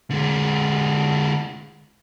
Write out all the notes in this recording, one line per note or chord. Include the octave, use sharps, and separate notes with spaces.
D3 G#3